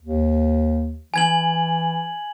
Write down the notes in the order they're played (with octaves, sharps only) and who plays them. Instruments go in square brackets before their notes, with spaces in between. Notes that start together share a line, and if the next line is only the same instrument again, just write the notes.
[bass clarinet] D#2
[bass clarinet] E3 [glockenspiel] G#5 G#6 F#7